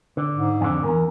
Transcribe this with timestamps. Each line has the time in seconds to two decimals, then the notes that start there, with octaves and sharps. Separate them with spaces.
0.17 D3
0.35 G#2
0.61 F2 D3
0.83 E2 G#2 A#4